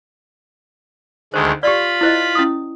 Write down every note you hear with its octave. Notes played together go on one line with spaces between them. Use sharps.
D2 D#3 G#3 C5
F4 G4 D5 B5
E4 C5 D#5
C#4 E4 D#6